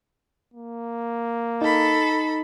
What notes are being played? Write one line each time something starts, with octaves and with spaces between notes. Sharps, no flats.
A#3
D#4 A4 B5